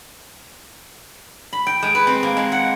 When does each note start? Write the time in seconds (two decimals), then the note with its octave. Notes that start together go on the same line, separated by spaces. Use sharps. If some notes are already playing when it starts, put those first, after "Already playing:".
1.53 B5
1.67 G5
1.82 G#3
1.95 B4
2.07 C4
2.23 A#3
2.37 G#3
2.52 F#5